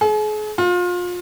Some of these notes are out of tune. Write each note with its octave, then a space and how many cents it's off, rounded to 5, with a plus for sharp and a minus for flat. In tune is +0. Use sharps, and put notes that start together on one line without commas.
G#4 +40
F4 +30